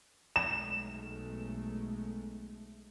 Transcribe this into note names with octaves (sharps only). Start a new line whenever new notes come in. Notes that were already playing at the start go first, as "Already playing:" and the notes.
B1 G#3 A3 E7